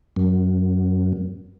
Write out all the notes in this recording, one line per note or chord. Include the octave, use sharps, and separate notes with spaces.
F#2